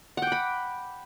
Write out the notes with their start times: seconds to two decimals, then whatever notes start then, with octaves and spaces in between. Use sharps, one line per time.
0.17 F#5
0.22 G5
0.27 D6
0.32 B5